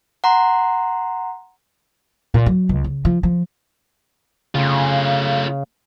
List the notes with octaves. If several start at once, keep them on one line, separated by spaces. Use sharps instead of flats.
F#5 A#5 C6
A#2
F#3
C#2
C#3
F3
F3
C#3 A3 F4